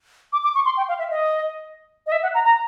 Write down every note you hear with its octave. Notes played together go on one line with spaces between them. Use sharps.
D6
D6
C#6
C6
G5
F5
E5
D#5
D#5
E5
F#5
A#5
A#5